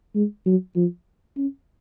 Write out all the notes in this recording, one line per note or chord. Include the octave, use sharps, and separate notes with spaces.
G#3
F#3
F3
C#4